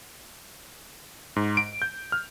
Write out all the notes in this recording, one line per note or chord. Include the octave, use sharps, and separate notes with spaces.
G#2
D7
G6
F6